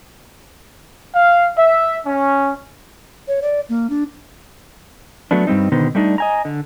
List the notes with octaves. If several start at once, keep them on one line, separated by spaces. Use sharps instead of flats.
F5
E5
C#4
C#5
D5
A#3
D4
F#3 A3 B3 D4
G2 G3 G#3 C4 D#4
B2 D3 D#3 B3 D#4 C5
G3 A3 D4 D#4
D#5 G#5 A#5
D3